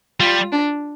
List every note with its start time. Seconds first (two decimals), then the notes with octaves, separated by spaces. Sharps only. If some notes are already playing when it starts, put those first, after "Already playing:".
0.20 G3 F4
0.52 D4